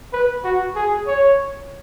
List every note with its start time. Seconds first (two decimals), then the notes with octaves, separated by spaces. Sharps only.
0.13 B4
0.44 F#4
0.76 G#4
1.07 C#5